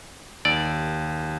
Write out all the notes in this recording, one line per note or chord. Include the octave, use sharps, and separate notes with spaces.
D#2 D5 E6